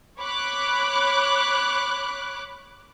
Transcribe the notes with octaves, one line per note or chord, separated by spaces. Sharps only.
C#5 B5 D6 F#6